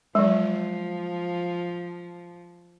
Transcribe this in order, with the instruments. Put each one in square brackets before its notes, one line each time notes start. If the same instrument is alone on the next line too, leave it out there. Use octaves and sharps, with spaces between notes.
[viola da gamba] F3 [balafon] F#3 G#3